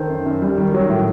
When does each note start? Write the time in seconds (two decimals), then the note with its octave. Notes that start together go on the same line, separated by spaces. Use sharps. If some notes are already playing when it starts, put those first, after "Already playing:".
Already playing: D#3 A4 C5
0.09 F#2
0.26 F#2
0.42 G3
0.58 D#3
0.74 F#3
0.90 A2